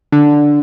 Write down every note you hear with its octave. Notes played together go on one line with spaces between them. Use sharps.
D3